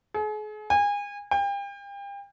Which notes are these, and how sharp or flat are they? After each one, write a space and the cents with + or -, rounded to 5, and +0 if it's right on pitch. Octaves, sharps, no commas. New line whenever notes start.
G#4 +40
G#5 -30
G5 +35